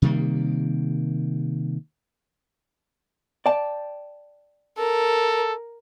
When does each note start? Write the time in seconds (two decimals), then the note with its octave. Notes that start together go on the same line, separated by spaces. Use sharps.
0.02 C3 D#3 G3 A#3
3.46 D5 G5 A5
4.78 A4 A#4